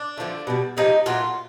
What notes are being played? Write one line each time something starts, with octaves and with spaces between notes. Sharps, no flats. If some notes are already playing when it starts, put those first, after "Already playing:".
Already playing: D4
D3 F3 A3
B2 G3
C3 F3 G#3 D#4
A#2 F#3 A3 F4